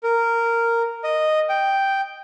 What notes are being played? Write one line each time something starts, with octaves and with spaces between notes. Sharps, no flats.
A#4
D#5
G5